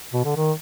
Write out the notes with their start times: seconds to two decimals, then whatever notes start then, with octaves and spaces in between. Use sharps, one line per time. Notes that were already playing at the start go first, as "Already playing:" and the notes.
0.13 B2
0.25 D3
0.36 D#3